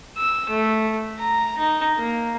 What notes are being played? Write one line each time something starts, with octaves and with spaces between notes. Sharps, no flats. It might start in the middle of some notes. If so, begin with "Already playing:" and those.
E6
A3
A#5
D#4
A#3